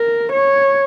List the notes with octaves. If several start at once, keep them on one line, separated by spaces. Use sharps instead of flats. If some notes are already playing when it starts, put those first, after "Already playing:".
Already playing: A#4
C#5